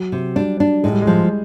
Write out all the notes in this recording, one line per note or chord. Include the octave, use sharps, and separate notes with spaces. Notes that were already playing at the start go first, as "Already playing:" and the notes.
Already playing: F#3
C3
G3 D4
D4
A2 G#3
G3
G#3
F3